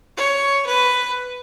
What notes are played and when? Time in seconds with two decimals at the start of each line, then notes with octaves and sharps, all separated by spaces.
0.17 C#5
0.66 B4